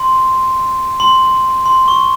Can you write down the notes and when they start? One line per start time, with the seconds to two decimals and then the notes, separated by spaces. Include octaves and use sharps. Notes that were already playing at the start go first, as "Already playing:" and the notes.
Already playing: C6
1.00 C6
1.66 C6
1.88 C#6